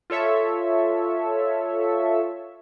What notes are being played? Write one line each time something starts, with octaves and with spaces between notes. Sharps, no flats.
F4 A4 C#5 E5